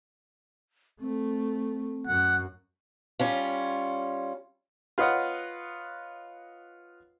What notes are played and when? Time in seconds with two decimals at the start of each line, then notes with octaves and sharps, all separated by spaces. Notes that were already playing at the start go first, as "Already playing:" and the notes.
1.01 A3 C4
2.07 F#2 F#5
3.19 G3 C#4 F4
4.98 F4 B4 C#5 D#5 F5 F#5